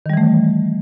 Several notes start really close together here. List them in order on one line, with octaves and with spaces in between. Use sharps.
D#3 G3 E3 A3